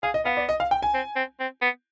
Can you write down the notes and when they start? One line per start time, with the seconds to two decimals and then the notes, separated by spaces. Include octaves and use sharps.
0.03 G#4 F5
0.14 D#5
0.25 B3 F5
0.37 D5
0.49 D#5
0.60 F5
0.71 G5
0.82 G#5
0.94 C4
1.16 C4
1.40 C4
1.62 B3